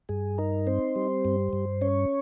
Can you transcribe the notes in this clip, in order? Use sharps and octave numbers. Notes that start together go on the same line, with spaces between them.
G2 G#4
D#4 A#4
C4 C5
G3
G2
G2
C#4 C#5